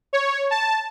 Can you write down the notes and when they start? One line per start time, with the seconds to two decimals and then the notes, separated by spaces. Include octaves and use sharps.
0.13 C#5
0.51 A5